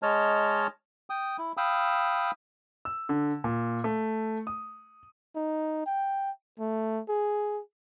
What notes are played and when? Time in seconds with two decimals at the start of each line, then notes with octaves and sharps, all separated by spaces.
0.03 G#3 C#5 D#5 A5 F6
1.10 G5 D#6
1.38 E4
1.57 F5 G5 B5 D#6 E6
2.85 E6
3.09 D3
3.44 A#2
3.84 A3
4.47 D#6
5.36 D#4
5.86 G5
6.59 A3
7.08 G#4